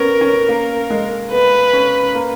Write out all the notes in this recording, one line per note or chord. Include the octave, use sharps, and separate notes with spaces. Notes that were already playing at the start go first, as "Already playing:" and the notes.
Already playing: B3 C#4 A#4
C#4
A#3
G#3
B3 B4
C#4
A#3